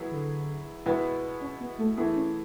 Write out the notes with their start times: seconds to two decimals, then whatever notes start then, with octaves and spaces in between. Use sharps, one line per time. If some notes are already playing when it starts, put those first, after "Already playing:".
Already playing: F#3 B3 E4 G#4
0.11 D3
0.86 B2 G#3 B3 E4
1.41 C#4
1.60 B3
1.79 A3
1.97 E3 A3 B3 E4 G#4
2.16 C#4